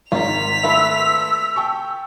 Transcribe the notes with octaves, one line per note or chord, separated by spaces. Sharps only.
G#1 D#3 F4 B6 F7
A3 F4 B4 E6
G5 A5 C#6